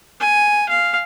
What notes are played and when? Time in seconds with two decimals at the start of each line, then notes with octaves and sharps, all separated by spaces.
0.20 G#5
0.69 F5